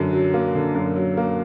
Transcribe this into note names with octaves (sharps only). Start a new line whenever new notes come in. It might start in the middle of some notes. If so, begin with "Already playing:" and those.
Already playing: F#2 D3
F#3
A#3
D3
F#2
F#3
A#3